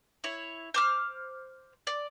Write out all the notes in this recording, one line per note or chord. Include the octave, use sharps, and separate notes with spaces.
E4 C#5
C5 D6 F6
D5